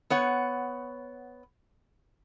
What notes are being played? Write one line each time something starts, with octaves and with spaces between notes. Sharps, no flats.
B3 C#5 F#5